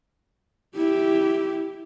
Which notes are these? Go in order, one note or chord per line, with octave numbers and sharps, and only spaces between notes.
E4 G4